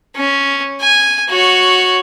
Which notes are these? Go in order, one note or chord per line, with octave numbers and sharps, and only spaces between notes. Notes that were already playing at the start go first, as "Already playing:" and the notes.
C#4
G#5
F#4 C#5